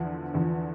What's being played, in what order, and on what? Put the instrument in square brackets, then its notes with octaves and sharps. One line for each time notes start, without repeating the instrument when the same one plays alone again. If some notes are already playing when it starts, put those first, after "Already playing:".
Already playing: [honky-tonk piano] E2 D3 F3
E2 D3 F3